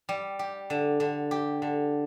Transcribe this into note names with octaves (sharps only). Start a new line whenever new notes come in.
G3
G4
D3
D3
G4
D3